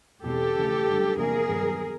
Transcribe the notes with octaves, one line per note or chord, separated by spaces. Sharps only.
E2 B2 G#3 C4 G4 A4
C#3 E3 A3
F#2 D3 G3
E2 C3 F3 A#3 D4 G#4 A#4
G2 D#3 F#3 B3